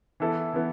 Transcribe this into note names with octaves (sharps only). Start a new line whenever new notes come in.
E3 B3 E4 A4
E3 B3 E4